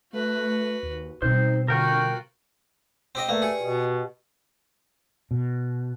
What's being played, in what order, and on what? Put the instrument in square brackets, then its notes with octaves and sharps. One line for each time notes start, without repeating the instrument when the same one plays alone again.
[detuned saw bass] A3 [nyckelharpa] F#4 B4
[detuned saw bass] D#2
[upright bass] B2 G3 [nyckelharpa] C4 [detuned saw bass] D#4 [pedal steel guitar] C5
[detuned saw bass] D3 [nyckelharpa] F4 F#4 [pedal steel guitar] A#4 G5 C#6
[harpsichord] C4 G4 D#5
[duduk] A3 [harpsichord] A#3 [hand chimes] B4 D5
[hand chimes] G4 C#7 [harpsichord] G#4
[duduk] B2 [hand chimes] G4 D#5
[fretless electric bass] B2